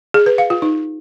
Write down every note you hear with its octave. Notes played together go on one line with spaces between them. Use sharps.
G#4
B4
F5
F4
D#4